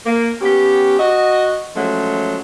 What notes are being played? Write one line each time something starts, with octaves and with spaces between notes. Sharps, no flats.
A#3
B3 C#4 G4
F#4 D#5
F3 F#3 G#3 A3 C#4